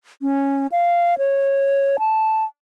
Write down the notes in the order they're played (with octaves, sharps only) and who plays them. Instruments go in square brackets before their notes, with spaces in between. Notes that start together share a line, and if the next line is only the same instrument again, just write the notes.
[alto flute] C#4
F5
C#5
A5